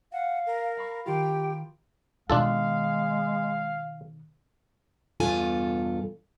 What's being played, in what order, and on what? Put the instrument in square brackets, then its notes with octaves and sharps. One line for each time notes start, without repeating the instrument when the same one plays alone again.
[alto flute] F5 [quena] F#5
[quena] A#4
[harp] F5 B5 C#6
[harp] D#3 F4 [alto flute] G4 [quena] G5
[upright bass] B2 D#3 [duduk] G#3 [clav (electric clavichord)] D4 F4 A4 [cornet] F5
[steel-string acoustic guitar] E2 G2 B2 F4 A4 G#5